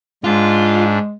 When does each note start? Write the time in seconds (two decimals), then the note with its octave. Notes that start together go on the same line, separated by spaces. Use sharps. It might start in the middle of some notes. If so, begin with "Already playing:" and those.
0.24 G#2 G#3 D4 F4